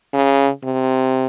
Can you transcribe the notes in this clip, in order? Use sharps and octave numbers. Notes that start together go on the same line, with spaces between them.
C#3
C3